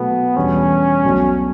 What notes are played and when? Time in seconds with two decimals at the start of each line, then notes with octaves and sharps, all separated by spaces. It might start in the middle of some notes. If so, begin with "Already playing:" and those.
Already playing: B2 F#3 A3 B3
0.36 E2 B2 G3 C#4 D4 F#4
1.04 B1 B2 A3 D4 F#4